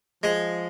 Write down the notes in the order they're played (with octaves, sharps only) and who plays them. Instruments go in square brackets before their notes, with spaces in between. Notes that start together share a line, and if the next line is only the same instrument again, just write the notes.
[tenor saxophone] F3 [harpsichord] G#3